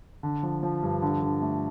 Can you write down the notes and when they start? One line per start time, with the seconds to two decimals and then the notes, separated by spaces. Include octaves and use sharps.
0.23 D3
0.43 F3
0.63 F3
0.83 G2
1.02 D3
1.22 D3
1.42 A3